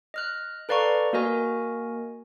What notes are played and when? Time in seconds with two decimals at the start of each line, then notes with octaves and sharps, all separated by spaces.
0.14 D#5 F6 F#6
0.69 A4 B4 D5 F5 A#5 C#6
1.13 A#3 F#4 A#4 D#5 G#5